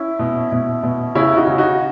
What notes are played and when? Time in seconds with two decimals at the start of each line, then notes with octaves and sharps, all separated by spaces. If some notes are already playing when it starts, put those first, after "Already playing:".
Already playing: C#4 E4
0.19 B2
0.52 B2
0.83 B2
1.15 C#3 C#4 E4
1.37 D#4 F#4
1.47 C#3
1.58 D#4 F#4